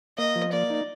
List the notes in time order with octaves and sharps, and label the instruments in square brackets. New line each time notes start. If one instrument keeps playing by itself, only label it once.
[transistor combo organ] A#3 [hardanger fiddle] D#5
[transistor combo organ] F3
[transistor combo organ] A#3 [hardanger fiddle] D5
[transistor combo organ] D#4